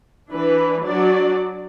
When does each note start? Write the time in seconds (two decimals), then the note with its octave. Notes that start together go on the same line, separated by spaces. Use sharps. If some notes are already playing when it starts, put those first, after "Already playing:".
0.30 E3 D4 B4
0.85 F#3 D4 F#4 D5